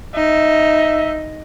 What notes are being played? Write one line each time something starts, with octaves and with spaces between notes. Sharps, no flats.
D#4 E5